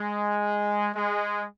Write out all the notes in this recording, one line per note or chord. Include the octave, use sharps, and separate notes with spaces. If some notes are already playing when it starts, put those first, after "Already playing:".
Already playing: G#3
G#3